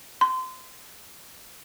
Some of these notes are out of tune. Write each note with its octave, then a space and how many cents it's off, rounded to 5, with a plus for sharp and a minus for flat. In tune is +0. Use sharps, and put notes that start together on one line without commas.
C6 -25